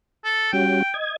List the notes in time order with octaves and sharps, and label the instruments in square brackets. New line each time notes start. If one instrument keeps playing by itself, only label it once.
[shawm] A4
[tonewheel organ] G3 C#4 F#4 [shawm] G5
[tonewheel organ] D#5 G#6